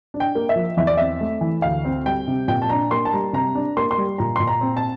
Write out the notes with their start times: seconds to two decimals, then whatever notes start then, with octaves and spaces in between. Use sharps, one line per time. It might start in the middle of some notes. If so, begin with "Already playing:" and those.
0.14 D4
0.20 G5
0.35 A#3
0.49 E5
0.56 F3
0.77 E2 E5
0.87 D5
0.97 C4 E5
1.21 A3
1.41 E3
1.62 D2 F5
1.85 C4
2.05 G3 G5
2.28 C3
2.48 A#2 G5
2.62 A5
2.70 D4 A#5
2.91 A#3 C6
3.05 A5
3.12 G3 A#5
3.33 C3 A#5
3.55 D4
3.77 A#3 C6
3.91 C6
3.97 G3
4.18 A#2 A#5
4.36 A#2 C6
4.47 A#5
4.61 C4
4.77 A5